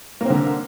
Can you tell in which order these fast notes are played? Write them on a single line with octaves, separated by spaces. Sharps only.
A#3 C4 D3